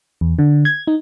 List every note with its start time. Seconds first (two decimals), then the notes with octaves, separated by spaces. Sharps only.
0.21 E2
0.39 D3
0.65 G#6
0.87 D#4